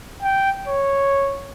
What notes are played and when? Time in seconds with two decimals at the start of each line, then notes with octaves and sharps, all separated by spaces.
0.22 G5
0.68 C#5